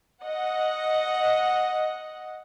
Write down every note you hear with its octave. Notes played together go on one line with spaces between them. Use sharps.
D#5 F#5